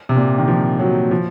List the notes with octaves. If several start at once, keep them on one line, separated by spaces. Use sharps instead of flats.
C3
A#2
D#3
F3
F#3
F3